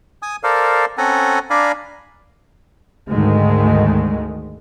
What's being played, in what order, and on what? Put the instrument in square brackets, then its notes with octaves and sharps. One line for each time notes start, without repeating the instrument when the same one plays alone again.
[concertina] G#5 D#6
A4 A#4 C5 D5 F5
C4 C#4 A4 F#5 G#5 A#5
D4 D5 F5 G#5 A#5 B5
[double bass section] D2 G#2 D#3 G#3 A3